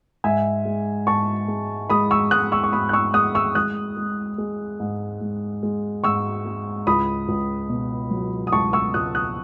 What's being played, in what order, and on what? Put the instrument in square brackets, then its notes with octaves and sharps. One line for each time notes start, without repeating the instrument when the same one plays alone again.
[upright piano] G#2 E5 G#5
G#3
G#2 A5 C#6
G#3
G#3 B5 D#6
C#6 E6
G#2 D#6 F#6
C#6 E6
C#6
G#2 B5 D#6
F#6
C#6 E6
G#3 D#6 F#6
C#6 E6
G#3 D#6 F#6
G#3
G#3
G#2
G#2
G#3
G#2 C#6 E6
G#3
C#2 B5 D#6
C#2
B2
F#3
D#6
C#2 A5 C#6
C#6 E6
C#2 D#6 F#6
D#6 F#6